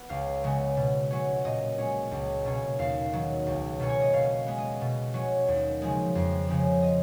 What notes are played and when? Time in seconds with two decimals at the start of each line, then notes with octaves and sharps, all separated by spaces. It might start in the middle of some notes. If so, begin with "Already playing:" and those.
Already playing: B3
0.09 C#2 F5
0.44 C#3 G#3 B3
0.77 B2
1.11 F#3 C#4
1.45 A#2 D#5
1.78 G#3 C#4
2.11 C#2
2.45 B2 A#3 C#4
2.79 D#2 F5
3.13 D#3 F#3
3.47 C#2
3.80 B2 A#3 C#4
3.89 C#5
4.02 D#5
4.13 B2 F5
4.46 G#3 B3
4.58 D#5
4.81 B2
5.14 F#3 C#4
5.48 D#2
5.82 C#3 F3 G#3
6.15 F2
6.48 C#3 F3 G#3
6.82 D#5